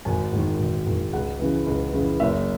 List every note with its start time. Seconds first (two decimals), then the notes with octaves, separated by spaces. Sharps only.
0.05 G#1 G#5
0.33 G#2 D#3
0.59 G#1
0.86 G#2 D#3
1.13 C#2 F#5
1.39 C#3 E3
1.66 C#2
1.93 C#3 E3
2.20 F#1 E5